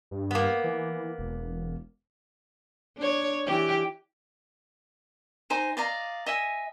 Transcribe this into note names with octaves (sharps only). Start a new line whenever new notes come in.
G2
A#3 B3
E3
E1
D4 C#5
E3 G4
D#4 C5 G#5 A#5
D5 D#5 F5 A#5
D#5 E5 G#5